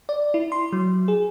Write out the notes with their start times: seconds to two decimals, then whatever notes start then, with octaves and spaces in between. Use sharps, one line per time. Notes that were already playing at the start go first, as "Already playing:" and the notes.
0.09 D5
0.34 E4
0.52 C6
0.72 F#3
1.08 G#4